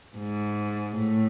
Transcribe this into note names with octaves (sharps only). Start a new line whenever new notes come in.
G#2
A2